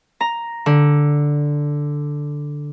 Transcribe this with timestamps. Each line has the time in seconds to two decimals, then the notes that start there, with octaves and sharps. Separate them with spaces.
0.21 A#5
0.66 D3